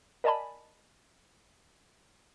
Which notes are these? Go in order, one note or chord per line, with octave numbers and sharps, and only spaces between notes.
A#4 D5 D#5 G#5 A5 B5